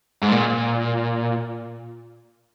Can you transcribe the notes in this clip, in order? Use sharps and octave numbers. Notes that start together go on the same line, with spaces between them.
G#2
A#2